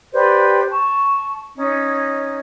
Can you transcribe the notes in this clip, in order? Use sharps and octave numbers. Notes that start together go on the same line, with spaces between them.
G4 B4 C5 D5
A5 C#6
C#4 D#4